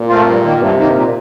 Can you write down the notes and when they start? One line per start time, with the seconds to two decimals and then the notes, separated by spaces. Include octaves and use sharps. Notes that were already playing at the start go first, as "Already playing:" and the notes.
Already playing: A#2
0.09 A3 C4 F4
0.27 G2
0.43 D#3 A#3
0.60 G2 C3
0.78 D#3 A#3
0.95 A#2